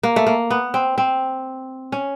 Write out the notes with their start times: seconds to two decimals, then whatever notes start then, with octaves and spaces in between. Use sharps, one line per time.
0.03 A#3
0.16 A3
0.27 A#3
0.50 B3
0.74 C4
0.98 C4
1.92 C#4